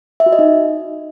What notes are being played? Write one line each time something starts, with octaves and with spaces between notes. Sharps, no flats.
E5
F#4
D#5
D#4